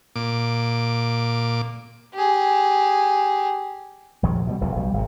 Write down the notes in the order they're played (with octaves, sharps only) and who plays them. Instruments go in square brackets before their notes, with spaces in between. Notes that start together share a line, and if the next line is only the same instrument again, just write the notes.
[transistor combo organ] A#2 D6
[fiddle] G4 G#4
[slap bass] A#1 F2 D#3 F#3
B2 E3 G3
F1 B1 E2 B2
B1 F#3 G3
G#1 C3